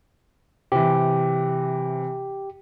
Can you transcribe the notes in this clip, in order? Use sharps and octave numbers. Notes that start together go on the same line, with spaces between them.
C3 E3 G4